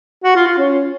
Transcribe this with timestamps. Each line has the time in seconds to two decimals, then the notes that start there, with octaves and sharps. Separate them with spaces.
0.24 F#4
0.35 F4
0.47 F4
0.58 C#4